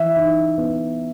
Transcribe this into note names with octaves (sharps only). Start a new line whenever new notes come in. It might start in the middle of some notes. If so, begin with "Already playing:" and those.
Already playing: E3 E5
D#4
B3